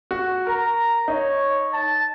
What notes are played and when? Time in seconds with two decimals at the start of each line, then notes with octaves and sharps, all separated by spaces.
0.11 F#4
0.47 A#4 A#5
1.08 D#4 C#5
1.73 A5